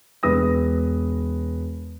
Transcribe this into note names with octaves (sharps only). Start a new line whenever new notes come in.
E1 B3 B4 D#6 A#6